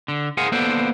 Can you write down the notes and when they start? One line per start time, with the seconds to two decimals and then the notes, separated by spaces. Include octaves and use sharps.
0.08 D3
0.37 G#4 A#4 C5 F5 F#5 G#5
0.52 A#3 B3 A4 C5 D5 F#5